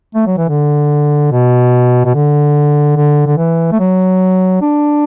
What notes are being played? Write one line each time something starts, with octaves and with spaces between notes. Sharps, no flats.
A3
F#3
E3
D3
B2
B2
D3
D3
D3
E3
A3
F#3
D4